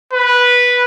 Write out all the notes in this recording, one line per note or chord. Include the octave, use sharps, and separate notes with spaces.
B4